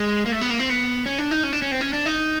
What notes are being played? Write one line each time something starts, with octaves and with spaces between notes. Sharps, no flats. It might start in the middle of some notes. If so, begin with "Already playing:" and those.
Already playing: G#3
A#3
A3
B3
A#3
C4
B3
C#4
D4
D#4
C#4
D4
C#4
C4
C#4
D4
D#4